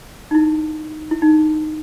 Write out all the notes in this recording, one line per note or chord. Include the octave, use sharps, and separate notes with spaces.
D#4
E4
E4
D#4